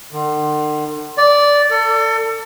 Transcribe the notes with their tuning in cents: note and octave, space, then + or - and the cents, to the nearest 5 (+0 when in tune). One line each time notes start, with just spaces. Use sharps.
D3 +45
D5 -10
A4 +30